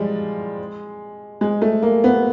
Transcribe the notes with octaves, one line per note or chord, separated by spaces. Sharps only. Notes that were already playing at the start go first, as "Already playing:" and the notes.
Already playing: F3 G3 G#3
G#3
A3
A#3
B3